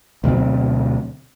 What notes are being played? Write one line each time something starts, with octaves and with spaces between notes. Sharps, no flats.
D2 B2 F#3 C4